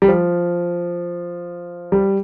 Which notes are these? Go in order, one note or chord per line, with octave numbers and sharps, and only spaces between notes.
G3
F3
G3